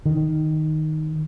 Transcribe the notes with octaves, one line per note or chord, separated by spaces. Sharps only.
D#3